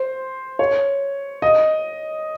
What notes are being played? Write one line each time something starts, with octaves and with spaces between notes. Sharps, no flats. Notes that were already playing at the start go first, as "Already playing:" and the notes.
Already playing: C5
C#5
D#5